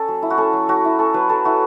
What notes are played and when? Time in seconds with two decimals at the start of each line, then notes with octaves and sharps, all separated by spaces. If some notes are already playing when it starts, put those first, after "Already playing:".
Already playing: C#4 A4
0.08 F#3
0.22 E4
0.30 F#4
0.38 C#4 A4
0.53 F#3
0.68 F#3 F#4
0.85 E4
0.99 C#4 A4
1.14 F#3 B4
1.29 F#3 A4
1.45 E4 F#4